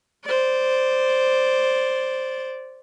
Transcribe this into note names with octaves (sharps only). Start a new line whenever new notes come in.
C5 D5